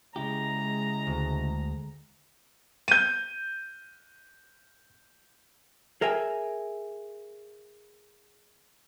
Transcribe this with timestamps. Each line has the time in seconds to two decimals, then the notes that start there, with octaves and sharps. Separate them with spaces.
0.16 C#3 G#3 E4 G4 A#5
1.07 D2
2.88 G6 D#7
6.01 G#4 A#4 E5 G5 G#5